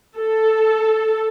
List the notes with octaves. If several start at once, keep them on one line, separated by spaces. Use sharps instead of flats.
A4